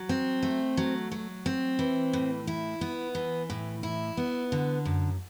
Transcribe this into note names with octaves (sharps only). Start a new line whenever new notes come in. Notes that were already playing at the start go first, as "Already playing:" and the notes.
Already playing: F#3
C4
A3
F#3
F#3
C4
E3
A2
E4
B3
E3
A2
E4
B3
D3
F#2